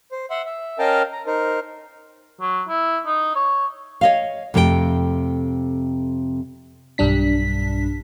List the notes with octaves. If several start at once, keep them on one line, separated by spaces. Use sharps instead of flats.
C5
E5 F#5 C6
E5
C#4 A#4 D#5 F5 G5 A5
A#5
D#4 A#4 C5
F#3
E4
D#4
C#5
C#5 D#5 F5
F2 C3 A3 A4 G5
B1 G2 G3 D4 B6